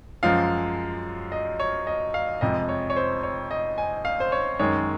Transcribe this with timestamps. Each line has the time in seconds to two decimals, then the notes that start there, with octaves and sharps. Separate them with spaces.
0.23 F#2 F3 G#3 F5
1.32 D#5
1.60 C#5
1.87 D#5
2.14 F5
2.41 F2 C3 F3 G#3 D#5
2.69 C#5
2.90 C#5
2.96 C5
3.23 C#5
3.51 D#5
3.78 G#5
4.05 F5
4.20 C5
4.32 C#5
4.59 F#2 D#3 G#3 C#5